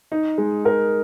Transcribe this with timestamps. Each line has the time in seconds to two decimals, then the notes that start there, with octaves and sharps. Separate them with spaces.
0.12 D#4
0.38 G#3
0.65 A#4